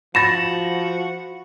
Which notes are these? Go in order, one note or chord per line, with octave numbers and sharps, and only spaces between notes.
F3 F#4 B5 A6 A#6 E7